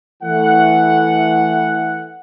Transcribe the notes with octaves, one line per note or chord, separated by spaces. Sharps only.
E3 A3 F#5